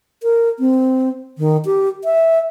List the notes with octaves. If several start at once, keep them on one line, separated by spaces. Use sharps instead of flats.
A#4
C4
D#3
G4
E5